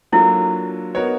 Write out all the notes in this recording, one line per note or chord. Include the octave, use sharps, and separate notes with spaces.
F#3 A#3 D4 E4 F4 A4
B3 D#4 F#4 A#4 C#5